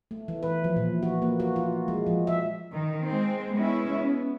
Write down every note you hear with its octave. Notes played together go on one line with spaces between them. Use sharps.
A3
E3
B4
F3
A#2
F#4
A#3
F#4
F4
G#3
F3
E5
D#3
G#3 C4
G#3 B3 C#4 E4
B3